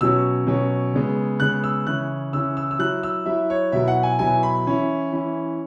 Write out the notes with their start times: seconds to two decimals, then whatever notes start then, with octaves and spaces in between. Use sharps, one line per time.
0.01 B2 F#3 C#4 E6
0.47 B2 F#3 C#4
0.94 C#3 G#3 B3
1.40 C#3 G#3 B3 F#6
1.64 E6
1.86 C#3 E3 C#4 E4 F#6
2.33 C#3 E3 C#4 E4 E6
2.57 E6
2.71 E6
2.79 F#3 E4 F#6
3.03 E6
3.26 F#3 E4 E5
3.50 C#5
3.72 B2 F#3 E4 E5
3.88 F#5
4.03 G#5
4.19 B2 F#3 E4 G#5
4.43 B5
4.66 E3 C#4 E4
5.13 E3 C#4 E4